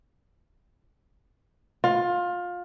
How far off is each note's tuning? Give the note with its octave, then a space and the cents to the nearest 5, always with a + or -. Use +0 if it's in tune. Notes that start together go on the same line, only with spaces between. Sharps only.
F4 +20